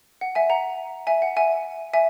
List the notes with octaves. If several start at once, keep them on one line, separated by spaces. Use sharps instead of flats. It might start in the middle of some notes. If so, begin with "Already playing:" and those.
F#5
E5 G#5
F#5 A#5
E5 G#5
F#5
E5 G#5
E5 G#5